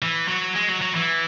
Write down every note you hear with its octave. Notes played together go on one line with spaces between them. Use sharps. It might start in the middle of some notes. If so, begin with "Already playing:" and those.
E3
F#3
G#3
F#3
F#3
E3